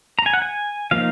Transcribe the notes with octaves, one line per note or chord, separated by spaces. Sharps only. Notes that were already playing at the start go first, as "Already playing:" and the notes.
A#5
G#5
F#5
G#5
F3 A#3 D#4 F5